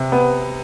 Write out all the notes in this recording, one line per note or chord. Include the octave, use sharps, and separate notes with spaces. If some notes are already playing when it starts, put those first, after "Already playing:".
Already playing: C3
B3